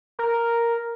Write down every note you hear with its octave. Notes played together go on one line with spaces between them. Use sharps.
A#4